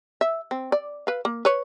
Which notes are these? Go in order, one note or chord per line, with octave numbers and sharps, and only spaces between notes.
E5
C4
D5
B4 F5
A#3
B4 C#5